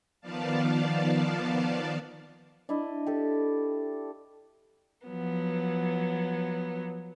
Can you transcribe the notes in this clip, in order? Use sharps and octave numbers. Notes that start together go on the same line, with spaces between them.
D#3 F3 B3 D5 F5 A5
D4 E4 D#5
G4 A4
F3 F#3 B3